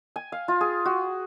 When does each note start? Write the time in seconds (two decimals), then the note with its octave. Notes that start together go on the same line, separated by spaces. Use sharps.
0.16 G#5
0.32 F5
0.48 F4
0.61 G#4
0.85 F#4